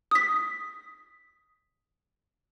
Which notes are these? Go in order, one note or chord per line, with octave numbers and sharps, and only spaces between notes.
D#6 B6